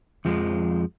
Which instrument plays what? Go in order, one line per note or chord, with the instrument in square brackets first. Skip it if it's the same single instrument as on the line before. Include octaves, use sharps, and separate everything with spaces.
[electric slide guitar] F2 F3 G#3